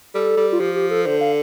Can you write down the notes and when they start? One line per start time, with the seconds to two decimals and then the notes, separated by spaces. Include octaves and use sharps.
0.14 G3 A4
0.37 G3
0.52 F4
0.60 F3 G4
0.75 G4
0.90 A4
1.05 D3 C5
1.21 F5